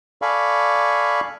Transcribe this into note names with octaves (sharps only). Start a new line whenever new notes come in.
A4 D5 F5 G#5 B5 C#6